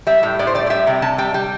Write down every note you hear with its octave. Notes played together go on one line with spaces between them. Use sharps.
G3 E5
A2
A2 D5
C5
G3 D5
D5
G3 E5
C3 G5
C3 A5
G3 G5
G3 G5